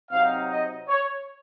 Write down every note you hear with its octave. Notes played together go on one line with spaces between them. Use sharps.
C3 F#3 C4 D#4 F5
D#5
C#5